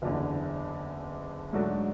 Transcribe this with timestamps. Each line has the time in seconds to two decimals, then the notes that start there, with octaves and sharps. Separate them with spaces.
0.02 F#1 E2 D3
1.53 G#2 F#3 A3 D4 F#4